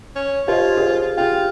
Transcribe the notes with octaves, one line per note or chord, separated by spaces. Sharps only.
C#4
F4 G4 C5 D#5
G#4 C5
F4 G#4 G5